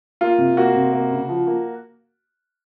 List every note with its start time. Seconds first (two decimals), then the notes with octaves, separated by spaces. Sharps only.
0.21 A#3 F4
0.38 C3
0.57 A#3 F#4
0.74 C3
0.93 A#3
1.11 C#3
1.29 F3
1.47 A#3